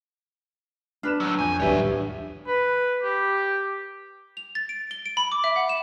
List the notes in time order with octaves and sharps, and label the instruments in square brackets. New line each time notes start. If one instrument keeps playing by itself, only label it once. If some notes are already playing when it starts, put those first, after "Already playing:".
[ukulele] D4 B4 [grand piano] F6 E7
[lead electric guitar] A2 F#3
[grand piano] F2 G6 [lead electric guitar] G#5
[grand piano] D1 E2 [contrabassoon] G2 [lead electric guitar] C#5 E5
[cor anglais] B4
G4
[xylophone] F7
A6
D7
G7
D7
B5
D6
E5
F#5
E7